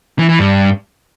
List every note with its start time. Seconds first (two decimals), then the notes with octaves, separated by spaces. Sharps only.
0.19 E3
0.29 E3
0.39 G2